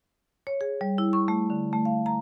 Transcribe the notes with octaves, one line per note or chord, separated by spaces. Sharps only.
C#5
G#4
G3
E4
C#6
A3
D3
A3
F5
A#5